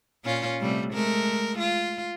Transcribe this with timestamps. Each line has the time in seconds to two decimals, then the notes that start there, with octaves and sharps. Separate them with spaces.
0.24 A#2 C#4 F4
0.60 C3 G3 A3
0.93 G#3 A3 A#4
1.59 F4